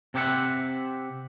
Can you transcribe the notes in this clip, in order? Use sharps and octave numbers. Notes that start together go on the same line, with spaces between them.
C3 C4 G4 C#5 E5 F#5